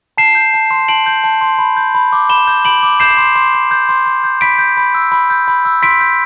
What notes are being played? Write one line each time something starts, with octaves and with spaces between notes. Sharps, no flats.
A5 C7 E7
G6
A5
C6
A5 D7 F#7
G6
A5
C6
B5
G6
B5
D6
B5 E7 G7
G6
B5 D7 F#7
D6
G6 C7 E7
C6
C6
G6
G6
C6
C6
G6
B5 B6 D7
G6
B5
E6
B5
G6
B5
E6
C6 B6 D7
G6